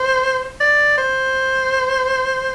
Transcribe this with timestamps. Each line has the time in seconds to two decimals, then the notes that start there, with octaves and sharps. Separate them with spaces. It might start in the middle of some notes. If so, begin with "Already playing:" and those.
Already playing: C5
0.61 D5
0.98 C5